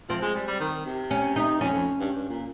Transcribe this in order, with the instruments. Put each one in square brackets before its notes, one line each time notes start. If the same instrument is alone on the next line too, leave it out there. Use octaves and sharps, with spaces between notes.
[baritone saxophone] F3 [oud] C4
[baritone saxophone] G#3
G3
G3
D#3
C3
[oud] C#4
D#4
[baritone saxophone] G2
[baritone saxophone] F2 [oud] C#4
[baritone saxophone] F2
G2
G2
A#2